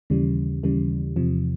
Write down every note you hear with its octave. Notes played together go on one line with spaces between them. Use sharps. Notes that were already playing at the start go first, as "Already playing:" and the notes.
D#2 C#3 E3 G3
D#2 C#3 E3 G3
E2 C3 F3